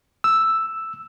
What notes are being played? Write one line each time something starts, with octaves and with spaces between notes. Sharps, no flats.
E6